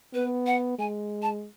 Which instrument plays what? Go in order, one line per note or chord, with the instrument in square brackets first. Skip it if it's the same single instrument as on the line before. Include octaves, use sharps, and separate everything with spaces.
[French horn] B3 [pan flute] B4
[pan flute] F#5
[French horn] G#3 [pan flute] G#5
[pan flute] A5